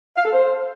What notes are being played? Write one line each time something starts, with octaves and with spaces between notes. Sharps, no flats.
F5
A4
C5